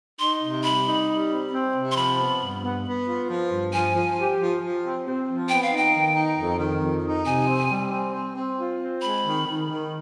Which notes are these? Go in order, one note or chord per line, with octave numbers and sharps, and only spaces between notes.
D#4 C6
C3
G3 B5
D#4
G3
C4
C4
C3
C6
F3 B5
B3
G2
B3
B3
F4
F3
G2
F3 G#5
F3
G4
F3
F3
C4
C4
F3
B3 G5
F5
D#4
G5
D#3
D#4
F2
D#3
F2
D#4
C3 G#5
C4
G3
C4
C4
C4
F4
C4
G#3 B5
D#3
D#3
D#3